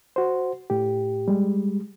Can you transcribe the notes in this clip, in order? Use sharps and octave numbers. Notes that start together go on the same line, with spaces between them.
F#4 C5
A2 G4
G3 G#3